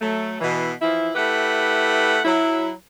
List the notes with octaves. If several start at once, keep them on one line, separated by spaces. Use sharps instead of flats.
F#3 A3
B2 E3
E3 F3 E4
A3 E4 G4 B4 F#5
F#3 E4